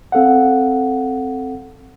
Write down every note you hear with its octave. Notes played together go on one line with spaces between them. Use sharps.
C4 A4 F5 F#5